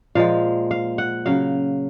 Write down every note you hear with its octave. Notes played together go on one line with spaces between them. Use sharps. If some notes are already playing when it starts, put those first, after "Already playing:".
A#2 F3 G#3 F5
F5
F#5
C#3 F#3 F5